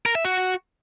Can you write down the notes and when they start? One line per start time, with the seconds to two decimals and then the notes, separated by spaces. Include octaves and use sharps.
0.06 A#4
0.15 E5
0.25 F#4